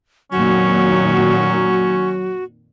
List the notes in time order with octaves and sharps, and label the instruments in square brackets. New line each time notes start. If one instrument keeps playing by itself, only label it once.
[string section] F2 A#2 D#3 [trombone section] F#3 [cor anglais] C#4 [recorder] F#4